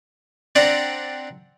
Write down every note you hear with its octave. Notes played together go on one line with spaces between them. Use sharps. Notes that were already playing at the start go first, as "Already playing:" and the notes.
C4 D4 D5 F#5 A#5